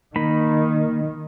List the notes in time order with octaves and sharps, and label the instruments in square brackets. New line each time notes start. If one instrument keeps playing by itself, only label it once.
[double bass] D#3 [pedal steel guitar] A#3 D#4 B5